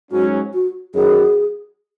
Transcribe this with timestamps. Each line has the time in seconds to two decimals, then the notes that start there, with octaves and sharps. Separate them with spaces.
0.12 G#2 F#3 C#4 F#4
0.54 F#4
0.95 F#2 D#3 F#3 B3 G#4